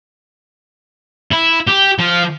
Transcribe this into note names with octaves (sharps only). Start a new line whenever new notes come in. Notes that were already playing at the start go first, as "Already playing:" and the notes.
E4
G4
F3